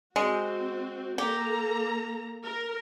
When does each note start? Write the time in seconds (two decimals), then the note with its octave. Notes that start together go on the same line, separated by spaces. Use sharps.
0.16 G#3 C4 F#4
1.18 A#3 G4 A4 A#5
2.44 A#4